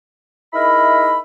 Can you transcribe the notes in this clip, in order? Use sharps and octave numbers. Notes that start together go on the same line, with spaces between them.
D#4 E4 G#4 A#4 E5 B5